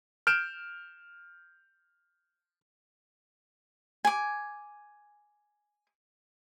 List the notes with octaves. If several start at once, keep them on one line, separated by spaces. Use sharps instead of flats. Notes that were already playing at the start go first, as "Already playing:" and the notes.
F6 G6 D7 E7
G#5 D6